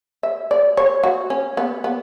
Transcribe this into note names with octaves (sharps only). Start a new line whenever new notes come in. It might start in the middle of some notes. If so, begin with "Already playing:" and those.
E5
D5
C#5
F#4
C#4
B3
B3